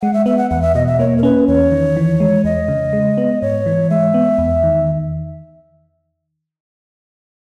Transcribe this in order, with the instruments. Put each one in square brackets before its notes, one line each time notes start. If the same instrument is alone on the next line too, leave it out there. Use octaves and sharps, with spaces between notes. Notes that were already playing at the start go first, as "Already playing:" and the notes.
[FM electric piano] G#3 [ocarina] F#5
[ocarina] E5
[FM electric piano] B3 [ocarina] E5
[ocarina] F#5
[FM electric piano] E2 [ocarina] F#5
[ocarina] E5
[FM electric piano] B2 [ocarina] D#5
[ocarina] E5
[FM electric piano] A#3 [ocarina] C#5
[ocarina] A#4
[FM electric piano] C#4 [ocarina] B4
[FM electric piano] E2 [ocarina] C#5
[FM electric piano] D#3
E3
G#3
[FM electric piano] E2 [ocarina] D#5
[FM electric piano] C#3
G#3
B3
[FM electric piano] G#2 [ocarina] C#5
[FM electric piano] E3
[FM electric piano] G#3 [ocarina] E5
[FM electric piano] B3
E2
D#3